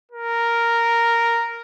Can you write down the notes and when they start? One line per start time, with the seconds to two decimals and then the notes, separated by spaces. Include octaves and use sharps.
0.12 A#4